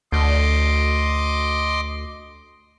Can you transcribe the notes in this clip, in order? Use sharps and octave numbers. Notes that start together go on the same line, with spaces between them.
D2 D#5 C6 D6